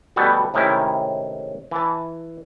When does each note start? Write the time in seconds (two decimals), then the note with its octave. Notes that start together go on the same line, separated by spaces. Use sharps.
0.16 D2 B2 G3 B3 A4
0.54 A2 C3 D#3 G#3 C#4 E4
1.71 E3 A5